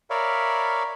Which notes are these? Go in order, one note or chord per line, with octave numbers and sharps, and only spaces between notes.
A#4 C#5 D5 E5 F5 B5